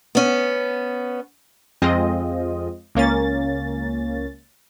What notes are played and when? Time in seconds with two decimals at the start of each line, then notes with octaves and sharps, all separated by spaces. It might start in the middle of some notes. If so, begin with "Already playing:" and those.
0.15 B3 C#4
1.82 F2 G#3 C4 F4 D#5
2.95 C#2 A#3 C#4 A6